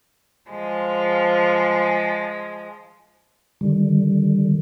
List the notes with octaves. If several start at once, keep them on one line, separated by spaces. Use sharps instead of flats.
F3 G#3
D3 D#3 G3